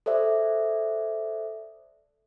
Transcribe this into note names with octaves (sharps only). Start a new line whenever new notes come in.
A4 C5 D5 E5